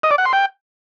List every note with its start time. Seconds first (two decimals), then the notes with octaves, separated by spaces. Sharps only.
0.03 D#5
0.11 D5
0.18 F#5
0.26 C6
0.33 G5